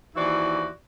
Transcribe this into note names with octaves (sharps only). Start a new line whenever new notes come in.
D#2 E3 E4 F#4 C5 D5